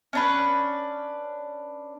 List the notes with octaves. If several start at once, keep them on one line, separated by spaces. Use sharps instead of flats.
C#4 D4 B4